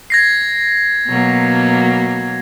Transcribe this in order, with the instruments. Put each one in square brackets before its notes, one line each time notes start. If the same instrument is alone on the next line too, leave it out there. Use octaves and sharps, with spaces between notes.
[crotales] G#6 A#6 C7
[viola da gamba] B2 F#3 A#3